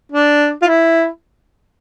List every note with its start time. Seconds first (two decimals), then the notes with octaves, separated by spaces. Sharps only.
0.12 D4
0.62 F4
0.68 E4